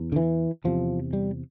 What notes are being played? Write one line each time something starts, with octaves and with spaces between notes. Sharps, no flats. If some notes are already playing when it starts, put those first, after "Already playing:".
Already playing: E2
D3
E3
E2 C3 F3
G3